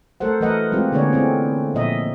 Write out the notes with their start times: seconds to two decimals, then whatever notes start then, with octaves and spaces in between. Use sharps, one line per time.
0.20 A3 A4 A#4 C5 F#5
0.40 E3 A3 A#4 B4 D#5 F#5
0.72 G#3 C4 F4 G4
0.92 D3 A#3 B3 G#4 C#5 D5
1.13 C4 E4 G#4
1.74 A#2 F3 D#5 E5